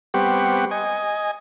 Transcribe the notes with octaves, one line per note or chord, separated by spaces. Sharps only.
G3 B3 C4 G4 F#5 C#6
D#5 G#5